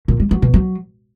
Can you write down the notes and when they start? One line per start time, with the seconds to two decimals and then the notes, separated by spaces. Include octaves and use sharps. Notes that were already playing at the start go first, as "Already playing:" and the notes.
0.08 A#2
0.20 G3
0.31 F#3
0.42 B2
0.54 F#3